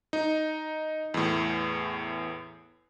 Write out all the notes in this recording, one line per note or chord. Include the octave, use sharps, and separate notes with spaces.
D#4
E2 A2